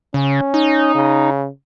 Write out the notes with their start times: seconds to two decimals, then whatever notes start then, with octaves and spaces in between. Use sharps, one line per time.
0.14 C#3 C#4
0.54 D#4
0.95 C#3